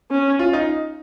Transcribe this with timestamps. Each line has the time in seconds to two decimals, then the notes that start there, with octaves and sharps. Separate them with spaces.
0.11 C#4
0.39 F4
0.53 D#4